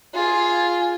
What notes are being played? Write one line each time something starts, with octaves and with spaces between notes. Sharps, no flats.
F4 G#4